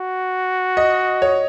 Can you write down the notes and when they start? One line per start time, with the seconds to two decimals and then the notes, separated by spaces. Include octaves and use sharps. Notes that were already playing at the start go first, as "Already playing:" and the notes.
Already playing: F#4
0.77 D#5
1.22 C#5